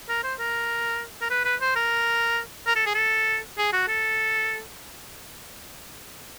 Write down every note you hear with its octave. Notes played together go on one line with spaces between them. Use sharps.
A#4
C5
A#4
A#4
B4
B4
C5
A#4
A#4
A4
G#4
A4
G#4
F#4
A4